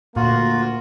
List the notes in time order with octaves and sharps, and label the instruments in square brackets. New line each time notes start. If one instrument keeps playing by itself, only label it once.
[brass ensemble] D2 A#3 [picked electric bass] A#2 [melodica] F4 [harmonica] F#4